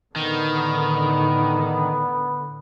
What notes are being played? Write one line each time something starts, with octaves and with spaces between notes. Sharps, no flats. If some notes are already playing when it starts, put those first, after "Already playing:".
A2 D3 D#3 B3